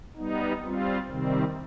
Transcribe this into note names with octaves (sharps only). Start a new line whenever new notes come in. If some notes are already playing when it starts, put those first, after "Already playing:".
G3 B3 D#4
G3 C4 F4
C3 D#3 G3 C4